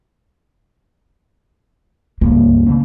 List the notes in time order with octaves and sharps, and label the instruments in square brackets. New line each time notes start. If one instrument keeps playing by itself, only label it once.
[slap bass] C#2 G2 [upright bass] A#3
[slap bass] C#3 A3 C4